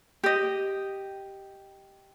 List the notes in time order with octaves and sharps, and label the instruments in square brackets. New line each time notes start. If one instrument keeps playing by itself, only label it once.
[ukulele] G4 D#5